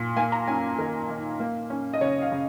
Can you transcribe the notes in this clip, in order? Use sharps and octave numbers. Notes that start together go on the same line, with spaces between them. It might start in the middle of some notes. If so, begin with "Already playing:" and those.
Already playing: A#2
A#3 G#5
A#5
C#4 G#5
D#3 A#4
D#3
A#3
C#4
D#5
C#3 C#5
F5
C#3